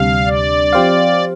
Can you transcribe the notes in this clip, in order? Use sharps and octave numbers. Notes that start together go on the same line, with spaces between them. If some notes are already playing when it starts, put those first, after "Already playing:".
Already playing: D2 C3 G3 D4 F5
D5
F3 C4 G4 C5 F5